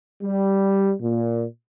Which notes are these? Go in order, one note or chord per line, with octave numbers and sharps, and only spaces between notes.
G3
A#2